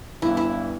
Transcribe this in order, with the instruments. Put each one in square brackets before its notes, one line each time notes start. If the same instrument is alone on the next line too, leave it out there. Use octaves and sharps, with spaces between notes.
[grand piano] G1 G2 E3 [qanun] E4
[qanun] E4